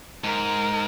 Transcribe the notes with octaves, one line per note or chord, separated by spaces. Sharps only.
G#2 A#4